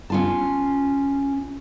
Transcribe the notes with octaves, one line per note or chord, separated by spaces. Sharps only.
C#4 F4 A5